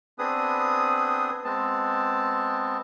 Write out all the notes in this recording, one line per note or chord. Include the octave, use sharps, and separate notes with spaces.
B3 C4 D4 G#4 B4 D#6
G#3 B3 C4 A5